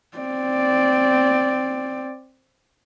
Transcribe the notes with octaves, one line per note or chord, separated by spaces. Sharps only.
C4 D5